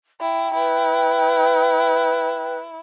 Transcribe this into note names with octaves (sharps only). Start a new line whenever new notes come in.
E4 G5
E4 B4